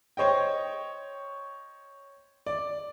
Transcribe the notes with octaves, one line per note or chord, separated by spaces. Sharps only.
C5 C#5 D#5 G5
D5